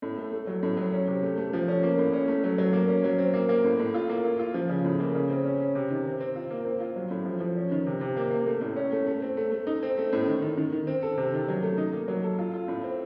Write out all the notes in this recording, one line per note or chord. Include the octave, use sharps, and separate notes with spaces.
A2
A3
A3
F#3
A2
F#3
C#4
C3
A3
A3
F3
C#4
A#3
A2
C#4
A3
F#3
F#3
A#3
C#4
F#3
C4
A#3
A#3
A2
A2
F4
A#3
F4
F4
F3
C#3
A2
A#3
C#3
C4
C#4
C#4
C3
D#3
C4
C4
F4
A#3
C4
F4
F#3
A2
F3
F3
C#4
D#3
C3
C3
A#3
A#3
A3
A2
C#4
A3
A3
C4
A3
A3
D#4
C4
A3
A2
D#3
D#3
D#3
D#3
C4
A4
C3
D#3
F#3
A3
D#4
A#3
F#3
A4
F4
F4
A2
C4